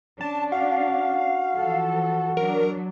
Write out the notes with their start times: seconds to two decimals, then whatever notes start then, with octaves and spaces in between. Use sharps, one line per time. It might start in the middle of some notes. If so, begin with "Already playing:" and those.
0.21 C#4 D4 A5
0.52 F#4 F5
1.55 E3 F3 A4
2.37 F#3 D4 A#4